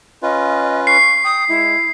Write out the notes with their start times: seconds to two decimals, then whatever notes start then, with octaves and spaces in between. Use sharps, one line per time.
0.23 C#4 F4 B4 D#5
0.87 C#6 C7
1.24 G5 D#6
1.49 G#3 E4